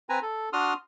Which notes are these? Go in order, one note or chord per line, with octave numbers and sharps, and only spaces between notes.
C4 B4 G#5 A#5
A4
D4 F#4 C6 D#6 F6